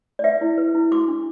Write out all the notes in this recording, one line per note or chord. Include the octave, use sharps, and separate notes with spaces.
D5
B4 E5
E4
B4
E4
F#4 D6
D4